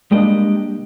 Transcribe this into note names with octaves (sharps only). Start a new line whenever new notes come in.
G3 G#3 A#3 D4 G4 D#5